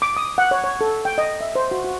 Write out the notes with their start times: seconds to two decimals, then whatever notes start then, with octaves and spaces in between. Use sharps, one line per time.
0.02 D6
0.17 D#6
0.38 F#5
0.51 C#5
0.64 C#5
0.81 A4
1.05 G5
1.18 D#5
1.41 E5
1.55 C5
1.71 F#4
1.84 F#4